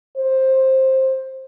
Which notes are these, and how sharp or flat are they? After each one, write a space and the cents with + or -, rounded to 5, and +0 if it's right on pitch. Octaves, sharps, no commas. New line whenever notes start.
C5 +15